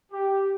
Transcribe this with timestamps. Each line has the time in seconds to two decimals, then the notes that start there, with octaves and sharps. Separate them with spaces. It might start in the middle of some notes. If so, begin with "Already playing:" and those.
0.13 G4